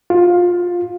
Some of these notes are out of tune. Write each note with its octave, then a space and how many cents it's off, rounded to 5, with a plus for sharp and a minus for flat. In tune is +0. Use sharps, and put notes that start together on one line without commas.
F4 +15